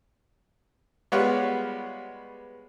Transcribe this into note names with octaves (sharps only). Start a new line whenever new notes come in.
G3 G#3 B3 F4 C#5 F#5